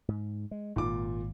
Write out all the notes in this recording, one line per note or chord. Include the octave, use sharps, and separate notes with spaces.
G#2
G#3
G#1 A#2 D6